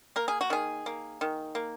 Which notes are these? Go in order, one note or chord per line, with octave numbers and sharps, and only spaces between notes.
A#3 A#4
G#4
F#4
D#3 G#4
A#3
D#3
A#3